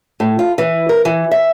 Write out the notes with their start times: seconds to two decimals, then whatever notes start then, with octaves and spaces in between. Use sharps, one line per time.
0.20 A2
0.39 F4
0.58 E3
0.89 A#4
1.05 E3
1.31 E5